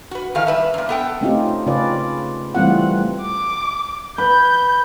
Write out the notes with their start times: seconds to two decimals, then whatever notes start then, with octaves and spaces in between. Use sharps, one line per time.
0.11 F#4 B4
0.35 D#3 E3 A4 F5
0.47 G3 B4 E5
0.74 F#2 A#2
0.89 B3 A4 G5
1.21 A3 C4 C#4 D#4 F4 G4
1.67 C#3 C#4 F4 B4 D5
2.55 E3 G3 A3 C4 F4 F#5
3.21 D6
4.18 B4 G6